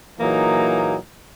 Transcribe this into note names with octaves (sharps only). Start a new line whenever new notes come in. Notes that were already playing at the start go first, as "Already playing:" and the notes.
A#2 E3 F#3 A#3 D#4 G#4